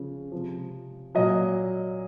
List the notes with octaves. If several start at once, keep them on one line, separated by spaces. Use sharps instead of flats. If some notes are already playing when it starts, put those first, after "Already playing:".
Already playing: C#3 F3
C3 F3
A#2 F#3 D#5